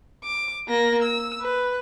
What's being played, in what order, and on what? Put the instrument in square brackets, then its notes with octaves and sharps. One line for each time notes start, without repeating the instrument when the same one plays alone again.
[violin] D6
A#3 A#6
E6
B4